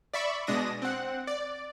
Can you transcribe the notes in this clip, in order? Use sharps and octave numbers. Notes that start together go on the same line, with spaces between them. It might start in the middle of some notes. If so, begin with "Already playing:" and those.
D5 E5 B5 C#6
B2 G#3 D4 D#6 A#6
C4 F#5
D5